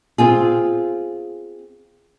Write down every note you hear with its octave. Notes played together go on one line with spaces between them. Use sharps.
C4 F4 G#4